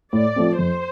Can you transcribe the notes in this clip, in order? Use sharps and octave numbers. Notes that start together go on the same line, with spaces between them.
A2 D5
F3 A3 C4
F2 C5